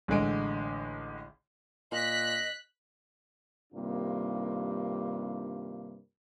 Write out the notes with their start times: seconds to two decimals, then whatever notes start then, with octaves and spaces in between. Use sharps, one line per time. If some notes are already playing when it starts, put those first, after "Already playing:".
0.08 A1 D3 G#3 D7
1.92 A#2 D#5 F#6 B6
3.73 G2 C3 D#3 A#3 D4 F4